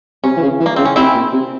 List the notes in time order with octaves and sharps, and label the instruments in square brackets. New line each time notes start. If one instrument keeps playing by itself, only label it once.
[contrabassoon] C3 [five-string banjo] C#4
[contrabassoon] E3
C#3
E3
[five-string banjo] A#3
[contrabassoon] C#3 [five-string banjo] C4
[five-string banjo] C#4
[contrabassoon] C3 [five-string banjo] C4 E4
[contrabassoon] A#2
C3